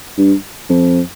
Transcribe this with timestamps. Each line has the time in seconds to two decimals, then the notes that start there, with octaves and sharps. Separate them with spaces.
0.18 G2
0.69 F2